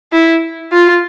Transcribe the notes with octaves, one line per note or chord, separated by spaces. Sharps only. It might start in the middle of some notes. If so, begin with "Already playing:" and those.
E4
F4